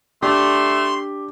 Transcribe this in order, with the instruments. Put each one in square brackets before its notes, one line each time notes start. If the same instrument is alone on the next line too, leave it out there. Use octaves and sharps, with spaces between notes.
[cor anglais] A3 [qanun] D4 [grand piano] G4 [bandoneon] C6